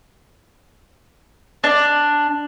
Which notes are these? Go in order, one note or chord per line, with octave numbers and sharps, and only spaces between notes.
D4